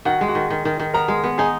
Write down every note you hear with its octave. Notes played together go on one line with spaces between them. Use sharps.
D#3 F#4 F#5
G#3
F#4 F#5
D#3
D#3
D#3
D#3
B3 A#4 A#5
G#3
B3
D#4 G#4 G#5